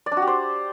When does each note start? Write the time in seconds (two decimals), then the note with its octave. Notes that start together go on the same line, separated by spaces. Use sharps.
0.06 D5
0.12 D4
0.17 F#4
0.22 G4
0.27 C5